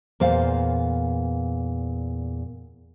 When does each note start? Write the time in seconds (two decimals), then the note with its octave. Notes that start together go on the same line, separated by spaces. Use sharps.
0.20 E2 A#2 C5 F5